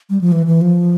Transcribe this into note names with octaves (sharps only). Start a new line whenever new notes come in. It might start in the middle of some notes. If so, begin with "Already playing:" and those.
G3
F3
E3
E3
F3